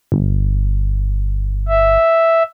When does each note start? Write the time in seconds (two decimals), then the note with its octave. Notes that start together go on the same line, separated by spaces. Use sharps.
0.12 G1
1.68 E5